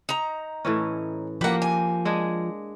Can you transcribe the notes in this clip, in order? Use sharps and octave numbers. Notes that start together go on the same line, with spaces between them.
D#4 A#5
A2 E3 C#4
F3 A#3 G4 B4 F#5
G#5
G#3 D4 G#4